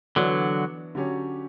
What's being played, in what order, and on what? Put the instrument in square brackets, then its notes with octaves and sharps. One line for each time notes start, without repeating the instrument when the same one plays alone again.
[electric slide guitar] D3 F#3 [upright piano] E3 B3 D4 F#4 C#5
[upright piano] D3 F#3 C#4 G4 C#5